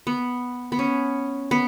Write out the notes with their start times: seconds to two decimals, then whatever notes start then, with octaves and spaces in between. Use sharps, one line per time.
0.07 B3
0.72 B3
0.79 C#4
1.51 B3